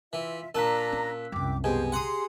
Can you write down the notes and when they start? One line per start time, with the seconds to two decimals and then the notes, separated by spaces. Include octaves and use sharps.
0.13 E3 F4 E5
0.55 A#2 D4 A5 A#5 E6 F#6 B6
0.92 C#4
1.32 C2 F#2 G5 D6
1.64 B2 G4 G#4 C5 G#5
1.92 F#5 A#5 C6 D#6